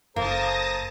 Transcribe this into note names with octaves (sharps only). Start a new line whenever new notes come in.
F#1 A#3 A4 C5 A5 A#5 D#6 A#6